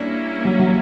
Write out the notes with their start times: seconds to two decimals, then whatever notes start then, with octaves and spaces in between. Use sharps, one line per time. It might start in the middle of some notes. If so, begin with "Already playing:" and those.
Already playing: G3 A#3 C#4 D4 E4
0.45 F#3
0.59 F#3